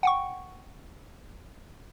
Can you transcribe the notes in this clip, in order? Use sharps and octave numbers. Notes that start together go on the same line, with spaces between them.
F#5 G5 C#6